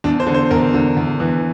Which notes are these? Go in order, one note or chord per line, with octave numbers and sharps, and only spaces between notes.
E2 D4
C5
D3
C5
E2 A#4
D3
E2
E3